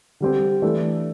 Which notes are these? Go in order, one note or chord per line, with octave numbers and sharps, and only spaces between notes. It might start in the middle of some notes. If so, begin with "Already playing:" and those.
D3 G3 C4
E3 A3 D4